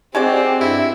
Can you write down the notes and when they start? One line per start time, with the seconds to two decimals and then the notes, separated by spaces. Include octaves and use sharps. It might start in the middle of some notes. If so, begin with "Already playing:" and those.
0.15 G#3 C4 F#4 G4 D5
0.61 G2 E4